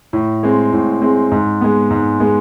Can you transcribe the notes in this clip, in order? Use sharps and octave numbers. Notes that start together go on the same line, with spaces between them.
A2
G#3 C4
A2
G#3 C4
G#2
G#3 B3
G#2
G#3 B3